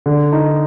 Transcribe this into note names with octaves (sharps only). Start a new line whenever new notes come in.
D3
D#4